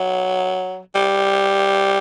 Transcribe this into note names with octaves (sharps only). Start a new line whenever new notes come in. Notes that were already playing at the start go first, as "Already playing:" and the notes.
Already playing: F#3
G3